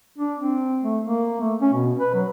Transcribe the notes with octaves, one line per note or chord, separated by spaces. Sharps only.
D4
C4
A3
A#3
A3
C#4
B2
B4
F#3